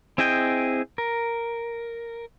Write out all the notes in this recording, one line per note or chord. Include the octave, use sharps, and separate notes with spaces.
C4 E4 G#4 D#5 G5
A#4